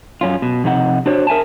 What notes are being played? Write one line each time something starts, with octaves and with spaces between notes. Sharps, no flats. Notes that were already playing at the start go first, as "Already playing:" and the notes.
F#2 C#4 F4
B2
F2 C3 D#4 F#5
D4 F#4 C5 C#5
A#4 E5 G#5 A5